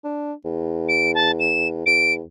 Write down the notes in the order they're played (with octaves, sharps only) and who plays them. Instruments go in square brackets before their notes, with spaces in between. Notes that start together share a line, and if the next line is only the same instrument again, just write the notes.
[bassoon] D4
E2
[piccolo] D7
A5
E7
[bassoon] E2 [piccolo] D7